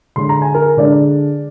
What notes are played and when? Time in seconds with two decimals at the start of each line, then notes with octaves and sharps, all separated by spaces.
0.16 D3 G#3 D4 C6
0.29 A#5
0.42 G#5
0.54 A#4 A#5
0.77 D3 G#3 D4 D5